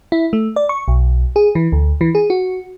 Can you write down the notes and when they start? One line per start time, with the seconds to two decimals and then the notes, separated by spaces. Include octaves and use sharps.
0.12 E4
0.33 A3
0.56 D5
0.69 C#6
0.88 B1
1.36 G#4
1.55 E3
1.72 D2
2.01 E3
2.15 G#4
2.30 F#4